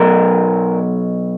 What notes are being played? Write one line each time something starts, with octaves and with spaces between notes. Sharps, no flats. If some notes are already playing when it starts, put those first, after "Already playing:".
Already playing: B2 F#3 A#4